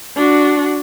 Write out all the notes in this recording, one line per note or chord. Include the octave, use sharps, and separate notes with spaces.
D4 F#4